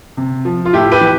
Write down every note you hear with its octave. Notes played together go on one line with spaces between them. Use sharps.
C3
F3
F4
A2 E4 G4
G4 B4
E3